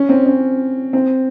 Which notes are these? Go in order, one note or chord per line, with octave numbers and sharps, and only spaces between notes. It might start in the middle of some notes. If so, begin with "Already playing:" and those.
Already playing: C#4
C4
C#4
C4